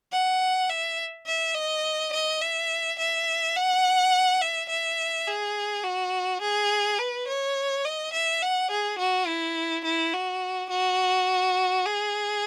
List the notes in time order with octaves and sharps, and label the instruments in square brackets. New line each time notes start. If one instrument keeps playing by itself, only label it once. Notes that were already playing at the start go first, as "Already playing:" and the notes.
[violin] F#5
E5
E5
D#5
D#5
E5
E5
F#5
E5
E5
G#4
F#4
G#4
B4
C#5
D#5
E5
F#5
G#4
F#4
E4
E4
F#4
F#4
G#4